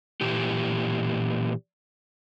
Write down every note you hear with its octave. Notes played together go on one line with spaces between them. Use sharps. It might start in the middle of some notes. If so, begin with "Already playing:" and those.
A#2 E3 G4